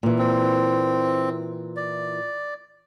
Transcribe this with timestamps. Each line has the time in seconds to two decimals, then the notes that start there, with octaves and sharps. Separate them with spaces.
0.03 A#2 E3
0.18 C4
1.77 D5